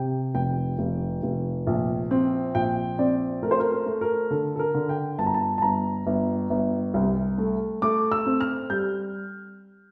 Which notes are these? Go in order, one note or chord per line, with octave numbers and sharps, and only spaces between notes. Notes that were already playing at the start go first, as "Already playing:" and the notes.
Already playing: C3 G5
F1 G5
F1
F1
A#1
C4
A#1 G5
C4 D5
A3 A#4
C5
A#4
A#4
A3
A#4
D3 A4
A4
A#4
D3
G5
G1 A5
A#5
A5
A5
G1 A#5
G1
G1
C2
A3
A3 D6
E6
C4
F6
G3 G6